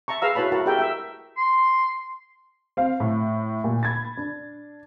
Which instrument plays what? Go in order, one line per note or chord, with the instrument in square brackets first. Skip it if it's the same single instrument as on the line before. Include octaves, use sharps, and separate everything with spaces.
[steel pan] E5 A5 A#5 C#6
G#4 B4 F5 A#5 E6
E4 F#4 B4 C#5 A5 B5
E4 F#4 A#4 A5
G4 G#4 A#4 E5 G5
A#4 E5 G5
[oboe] C6
[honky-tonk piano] C4 F5
A2
A#2
B5 G#6 A6
D4